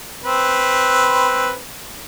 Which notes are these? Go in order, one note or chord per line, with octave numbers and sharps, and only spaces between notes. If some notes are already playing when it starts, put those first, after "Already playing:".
C4 B4